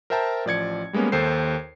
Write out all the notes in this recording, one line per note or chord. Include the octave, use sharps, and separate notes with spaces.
A#4 C5 E5 G5 A5 A#5
A1 F3 D5 G#6 C#7
G3 G#3 A#3 B3 C#4
D#2 D#3 A4 C5 C7